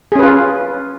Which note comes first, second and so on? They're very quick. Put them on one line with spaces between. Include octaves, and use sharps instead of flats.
G#4 C#4 B4 F4